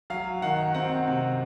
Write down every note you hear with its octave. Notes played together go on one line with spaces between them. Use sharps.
F#3 F5
D#3 F#5
C4 F#5
C3